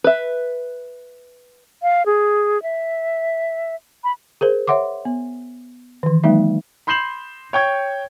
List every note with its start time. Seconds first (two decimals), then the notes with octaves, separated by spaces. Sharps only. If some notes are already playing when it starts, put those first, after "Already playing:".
0.04 B4 E5
1.83 F5
2.06 G#4
2.63 E5
4.04 B5
4.41 G#4 A#4 C5
4.67 C#5 E5 F#5 C6 D6
5.05 B3
6.03 D#3 E3
6.24 F#3 G#3 A#3 D#4 E5
6.87 B5 C6 G6 C7 E7 F#7
7.53 C#5 G5 C#6 G#6